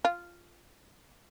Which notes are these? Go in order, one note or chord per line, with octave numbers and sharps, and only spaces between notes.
F4